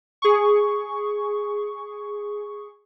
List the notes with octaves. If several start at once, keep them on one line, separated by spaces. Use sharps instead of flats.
G#4 C#6